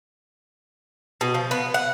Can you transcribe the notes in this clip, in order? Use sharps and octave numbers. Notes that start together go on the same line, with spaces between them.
B2
F3
B3
F#5